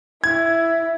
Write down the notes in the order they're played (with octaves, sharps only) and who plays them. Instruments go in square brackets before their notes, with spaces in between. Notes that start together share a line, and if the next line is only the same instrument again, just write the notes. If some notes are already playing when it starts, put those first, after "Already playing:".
[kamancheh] E4 [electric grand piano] G#6